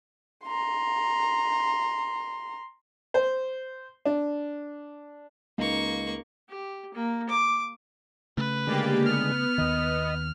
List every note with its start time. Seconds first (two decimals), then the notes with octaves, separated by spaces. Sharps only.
0.44 A#5 C6
3.14 C5
4.05 D4
5.58 C#2 A#3 D#4 C#6
6.49 G4
6.94 A#3
7.29 D6
8.37 C#3 A3 B4
8.67 D3 G#3 A#3 G4 A6
9.06 B3 F6
9.58 D#2 D#3 D#5